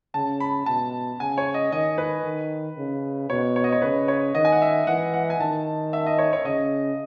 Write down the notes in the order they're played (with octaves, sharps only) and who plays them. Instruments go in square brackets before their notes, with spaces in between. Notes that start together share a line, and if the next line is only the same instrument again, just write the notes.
[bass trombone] C#3 [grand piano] A5
[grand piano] B5
[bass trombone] B2 [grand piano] A5
[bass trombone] C#3 [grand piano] G#5
[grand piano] C#5
D#5
[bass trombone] D#3 [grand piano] D#5
[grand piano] B4
[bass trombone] D#3
C#3
[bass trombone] B2 [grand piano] C#5
[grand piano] C#5
D#5
C#5
[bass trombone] C#3 [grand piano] B4
[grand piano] C#5
[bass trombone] D#3 [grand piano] D#5
[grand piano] G#5
F#5
E5
[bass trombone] E3 [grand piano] F#5
[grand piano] F#5
G#5
[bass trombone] D#3 [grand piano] A5
[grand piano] E5
D#5
C#5
C#5
[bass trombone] C#3 [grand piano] D#5